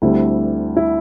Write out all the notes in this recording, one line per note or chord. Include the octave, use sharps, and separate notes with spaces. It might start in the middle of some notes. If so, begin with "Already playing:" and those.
D2 D3 G3 C4 E4
E4